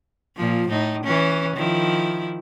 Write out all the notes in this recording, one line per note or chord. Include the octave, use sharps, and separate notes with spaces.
A#2 F3
A2 D#4
E3 C#4
D#3 F3 E4